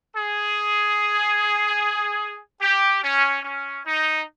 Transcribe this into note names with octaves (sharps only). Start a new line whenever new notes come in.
G#4
G4
C#4
C#4
D#4